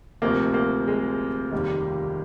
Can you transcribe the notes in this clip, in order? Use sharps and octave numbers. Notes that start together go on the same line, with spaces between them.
D2 C3 F3 A#3
A#3
G#3
F1 D#2 D#3 G3